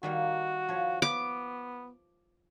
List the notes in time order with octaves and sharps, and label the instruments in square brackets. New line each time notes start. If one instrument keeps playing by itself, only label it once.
[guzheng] D#3 G3 A#3 [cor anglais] F#4
[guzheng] F3 C#5
[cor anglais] B3 [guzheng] B4 B5 [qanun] D6